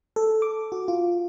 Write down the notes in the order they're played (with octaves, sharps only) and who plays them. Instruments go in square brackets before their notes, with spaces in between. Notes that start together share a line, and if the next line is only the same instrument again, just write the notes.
[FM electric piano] A4
D6
F#4
F4